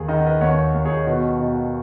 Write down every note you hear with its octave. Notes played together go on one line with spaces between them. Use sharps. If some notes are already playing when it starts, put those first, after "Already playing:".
Already playing: D#2 G#4
D#3 D#5
F#5
B4 D#5
D#2 C#5 F#5
D#2
G#4 C#5
C#5
B2 F#4 B4
B2